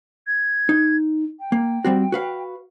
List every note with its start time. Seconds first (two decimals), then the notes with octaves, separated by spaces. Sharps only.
0.27 G#6
0.69 D#4
1.39 G5
1.52 A#3
1.85 G3 C4 F#4
2.12 F#4 B4 F5